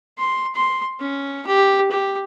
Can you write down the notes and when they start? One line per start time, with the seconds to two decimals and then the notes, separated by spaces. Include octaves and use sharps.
0.18 C6
0.55 C6
1.00 C#4
1.47 G4
1.91 G4